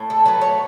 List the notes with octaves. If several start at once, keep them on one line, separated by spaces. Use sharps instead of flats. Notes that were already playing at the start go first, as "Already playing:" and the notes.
Already playing: A2
A4
F#3 A3 B4
C#5